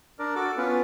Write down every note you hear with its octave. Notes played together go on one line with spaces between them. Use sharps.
D4 A#4 D5
F#4 A4 D6
B3 C#4 F4 B4